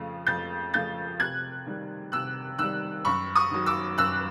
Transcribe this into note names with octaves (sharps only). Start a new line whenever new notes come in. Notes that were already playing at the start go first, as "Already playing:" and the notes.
Already playing: F2 C#3 F3 A3
F2 G6 A6
C#3 F3 A3 G6 A6
C3 F#6 G#6
D#3 G3
C3 E6 F#6
D#3 G3 E6 F#6
F#2 B5 C#6
C#6 D#6
D#3 F#3
D6 E6
F#2 E6 F#6